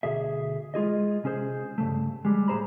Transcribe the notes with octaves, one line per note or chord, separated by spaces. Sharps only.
D2 B2 G#4 E5
G#3 F4 G#4 D#5
C3 C#4 G#4 C5
G2 C#3 A3
G3 G#3
B1 A2 G#4 C5 A#5 B5